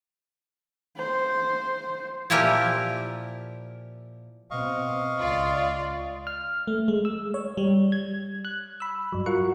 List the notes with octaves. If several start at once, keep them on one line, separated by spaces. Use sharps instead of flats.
C5
A#2 F3 E4 G4 A#4
B2 C4 D#5 F5 C#6
C#2 F4 D5
F6
A3
G#3
E6
C#5
G3
G#6
F#6
B5 E6
G2 F#3
F4 F#4 A#4 F#5 C#6